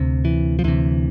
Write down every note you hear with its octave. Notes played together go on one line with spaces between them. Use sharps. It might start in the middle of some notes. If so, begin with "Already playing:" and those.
Already playing: D2 C3
E3
F3
D2 C3 E3